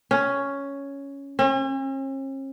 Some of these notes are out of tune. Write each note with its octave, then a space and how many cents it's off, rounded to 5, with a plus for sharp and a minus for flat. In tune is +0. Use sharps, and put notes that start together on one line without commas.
C#4 +5
C#4 -45